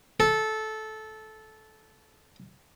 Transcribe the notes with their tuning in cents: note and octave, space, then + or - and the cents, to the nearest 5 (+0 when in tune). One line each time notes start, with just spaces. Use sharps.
A4 -15